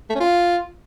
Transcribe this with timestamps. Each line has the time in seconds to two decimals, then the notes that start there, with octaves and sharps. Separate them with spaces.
0.10 A3
0.15 C#4
0.20 F4